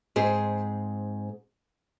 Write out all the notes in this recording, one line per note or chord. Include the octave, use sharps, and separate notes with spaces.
G#2 C4 G#4